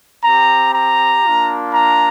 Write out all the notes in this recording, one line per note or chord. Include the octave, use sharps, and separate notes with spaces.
C4 G4 A#5
A#5
A#3 D4 F4
A#5